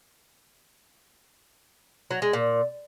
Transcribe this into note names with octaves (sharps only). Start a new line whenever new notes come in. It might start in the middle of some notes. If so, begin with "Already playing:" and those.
F#3
G#3
A#2